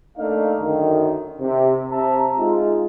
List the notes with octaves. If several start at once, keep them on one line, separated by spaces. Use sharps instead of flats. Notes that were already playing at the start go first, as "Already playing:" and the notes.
A3 A#3 D4 D#4 D5 F5
F#2 D3 D#3
C3
C3 E5 A5 A#5
G#3 D#4 F4